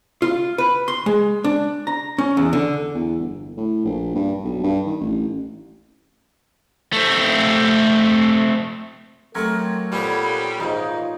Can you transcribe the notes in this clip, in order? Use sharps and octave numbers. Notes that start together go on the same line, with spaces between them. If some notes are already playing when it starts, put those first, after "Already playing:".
F4
B4
C6
G#3
D4
A#5
C#4
E2
D3
E2
G1
A2
A#1
G2
B1
G2
D#3
A1
A3 C4
F#3 A3 C4 G4 A4 A#4 C#5
A#2 G3 A#3 B3 C5 G#5 A#5
D#2 G#2 D#4 F4